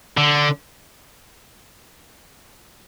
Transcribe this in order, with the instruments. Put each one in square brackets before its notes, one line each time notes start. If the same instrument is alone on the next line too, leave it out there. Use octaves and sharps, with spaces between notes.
[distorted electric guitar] D3